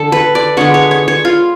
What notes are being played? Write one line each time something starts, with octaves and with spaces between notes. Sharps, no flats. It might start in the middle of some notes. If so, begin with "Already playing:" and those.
Already playing: D3 A4
B4
D5
D3 G#3 B3 C#5
C#5
C#5
C#5
F4